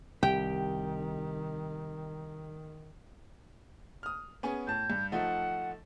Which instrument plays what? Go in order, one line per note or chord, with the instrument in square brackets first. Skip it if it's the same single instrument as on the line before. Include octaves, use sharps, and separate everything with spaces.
[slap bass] C2 [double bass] D#3 [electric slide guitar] G4 [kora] G5
[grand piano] D#6 F6
B3 C#4 G#4
[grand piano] A2 A5 [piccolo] G6
[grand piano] G2
[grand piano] F3 A3 D#4 [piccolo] F#5